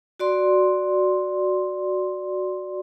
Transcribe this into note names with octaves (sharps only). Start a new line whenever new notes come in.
F#4 D5 C6